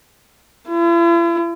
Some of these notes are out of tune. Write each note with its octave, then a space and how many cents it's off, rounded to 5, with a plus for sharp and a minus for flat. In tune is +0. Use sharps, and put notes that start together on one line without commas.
E4 +45